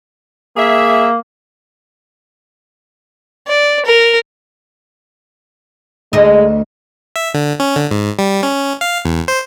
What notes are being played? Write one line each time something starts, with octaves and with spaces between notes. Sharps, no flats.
A#3 G#4 E5
D5
A#4
D2 G#3 D#4
E5
D3
C#4
D3
G#2
G3
C#4
F5
E2
C5